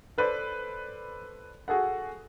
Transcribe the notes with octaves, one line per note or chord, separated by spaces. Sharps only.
A4 B4 C5 D5
F#4 G#4 A4 F#5